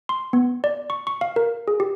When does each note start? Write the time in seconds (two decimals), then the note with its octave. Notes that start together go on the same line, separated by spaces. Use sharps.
0.09 C6
0.33 B3
0.64 D5
0.90 C#6
1.07 C#6
1.21 F5
1.36 A#4
1.68 G#4
1.80 G4